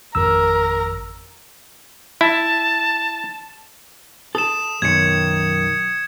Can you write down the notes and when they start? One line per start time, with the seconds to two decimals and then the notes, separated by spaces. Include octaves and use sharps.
0.15 G#1 F2 A#4 E6
2.21 E4 A5
4.35 A4 D#6 E7
4.82 B1 F#2 D#3 G#6 C#7